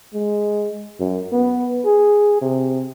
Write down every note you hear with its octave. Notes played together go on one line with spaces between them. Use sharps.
G#3
F#2
B3
G#4
C3